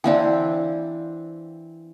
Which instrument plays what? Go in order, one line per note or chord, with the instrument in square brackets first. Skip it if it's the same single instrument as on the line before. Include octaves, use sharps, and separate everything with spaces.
[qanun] E3 C4 D4 [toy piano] D5 F5 G5